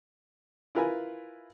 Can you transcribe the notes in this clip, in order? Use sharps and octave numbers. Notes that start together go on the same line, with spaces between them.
E4 F4 A#4 B4 G#5